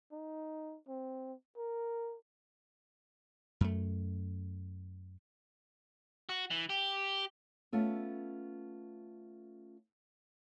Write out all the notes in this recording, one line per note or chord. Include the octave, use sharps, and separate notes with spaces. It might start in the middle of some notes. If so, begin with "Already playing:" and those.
D#4
C4
A#4
F#2 A3
F#4
E3
G4
A3 B3 C#4 F4 A4